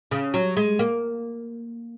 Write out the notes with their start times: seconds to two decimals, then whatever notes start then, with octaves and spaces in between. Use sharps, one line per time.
0.11 C#3
0.34 F#3
0.57 G#3
0.79 A#3